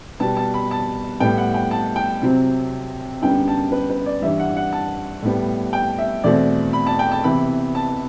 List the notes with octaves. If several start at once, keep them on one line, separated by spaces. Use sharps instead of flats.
B2 G3 B3 A5
A5
B5
A5
A2 G3 B3 G5
F#5
G5
A5
G5
C3 F#3 C4
F#2 D3 G3 B3 G5
A5
B4
B4
D5
G2 E3 G3 E5
F#5
F#5
A5
A2 G3 B3
G5
E5
E2 B2 A3 C4 D5
B5
A5
G5
A5
C3 E3 B3 B5
A5